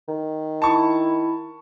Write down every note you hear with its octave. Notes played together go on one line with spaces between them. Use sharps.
D#3
E4 A5 C#6